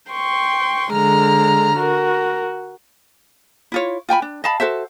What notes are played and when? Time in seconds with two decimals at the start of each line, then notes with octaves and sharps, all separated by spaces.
0.11 G5 C6 C#6
0.91 D3 G#3 A#5 F6
1.78 F#4 A#4
3.72 E4 F4 C#5
4.09 F4 G5 G#5 B5
4.22 D4
4.44 D#5 F5 A5 B5
4.60 F#4 A4 C5 E5